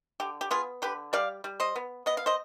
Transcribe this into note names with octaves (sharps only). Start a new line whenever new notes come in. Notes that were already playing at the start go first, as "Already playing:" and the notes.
D3 G4
G4
B3 F4 G#4
D3 G4 B4
G3 D5 F5
G3
C5 D#5
B3
B3 D#5
F5
C5 D#5